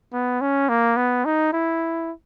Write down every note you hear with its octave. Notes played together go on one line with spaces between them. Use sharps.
B3
C#4
A#3
B3
D#4
E4